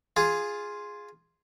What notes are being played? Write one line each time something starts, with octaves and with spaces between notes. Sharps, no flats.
F4 G#4